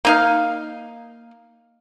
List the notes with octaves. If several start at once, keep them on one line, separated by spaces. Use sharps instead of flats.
A#3 D#4 F5